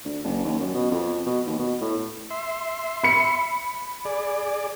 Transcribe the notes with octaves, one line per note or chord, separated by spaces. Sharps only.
D2
F#1
D#2
F#2
B2
F2
B2
D#2
B2
A2
E5 C6
B5 C#7
G#4 D5